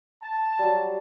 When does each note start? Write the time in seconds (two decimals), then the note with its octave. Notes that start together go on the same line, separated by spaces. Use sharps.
0.23 A5
0.59 F#3 G3